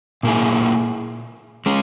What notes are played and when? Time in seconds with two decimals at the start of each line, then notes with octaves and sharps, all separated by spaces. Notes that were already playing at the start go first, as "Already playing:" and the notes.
0.23 A#2 A#3 E4 G#4
1.66 G#3 C#4